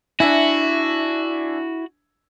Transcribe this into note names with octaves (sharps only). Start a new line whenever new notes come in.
D4 E4 F#4 E5 G#5